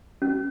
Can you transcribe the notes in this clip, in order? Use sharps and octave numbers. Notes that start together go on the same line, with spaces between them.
C#4